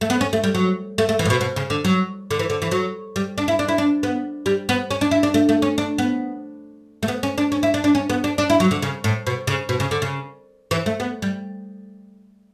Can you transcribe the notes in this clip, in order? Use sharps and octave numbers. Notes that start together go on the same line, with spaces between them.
A3
B3
C#4
A3
G3
F#3
A3
A3
E3
A2
B2
B2
C#3
D3
F#3
D3
E3
D3
E3
F#3
G3
D4
E4
D4
E4
D4
B3
G3
B3
C#4
D4
E4
D4
A3
A3
C#4
D4
B3
A3
B3
C#4
D4
C#4
E4
D4
D4
C#4
B3
D4
D4
E4
F#3
D3
C#3
A2
B2
C#3
B2
C#3
D3
C#3
E3
A3
B3
G3